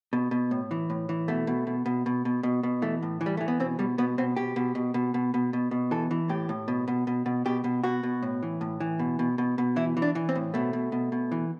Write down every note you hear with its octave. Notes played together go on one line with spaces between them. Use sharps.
B2
B2
A2
E3
A2
E3
B2 A3
B2
B2
B2
B2
B2
B2
B2
E3 A3
A2
E3
G3
E3 A3
B3
B2 C4
B2 G3
B2 B3
B2 C4
B2 G4
B2
B2
B2
B2
B2
B2
B2
E3 A4
E3
A2 G4
A2
B2
B2
B2
B2
B2 G4
B2
B2 F#4
B2
A2
E3
A2
E3
B2
B2
B2
B2
E3 E4
E3
D4
E3
C4
A2
B2 A3
B2
B2
B2
E3